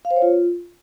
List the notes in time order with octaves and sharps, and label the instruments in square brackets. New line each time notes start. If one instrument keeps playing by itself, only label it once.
[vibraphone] F5
C5
C#5
F4